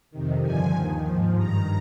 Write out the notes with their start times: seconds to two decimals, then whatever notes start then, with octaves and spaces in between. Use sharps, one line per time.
0.11 F2 C3 D#3
0.42 G2 D3 F3 G#5
0.73 D#2 D#3
1.04 G#2 F3
1.35 G2 D#3 A#5